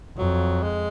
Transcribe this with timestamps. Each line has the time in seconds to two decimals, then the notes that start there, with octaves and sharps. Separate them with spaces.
0.17 F2 F#3
0.63 G#3